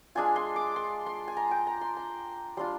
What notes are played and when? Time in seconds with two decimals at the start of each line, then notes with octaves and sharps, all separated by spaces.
0.15 G#3 D4 F4 G#5
0.36 C6
0.56 D6
0.76 C6
1.06 C6
1.28 G#5
1.37 A#5
1.51 G5
1.67 A#5
1.81 C6
1.97 A#5
2.57 G3 D4 F4 C6